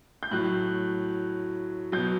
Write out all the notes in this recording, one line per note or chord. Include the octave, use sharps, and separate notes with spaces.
G6
A2 F#3 F#6
B2 F#3 G6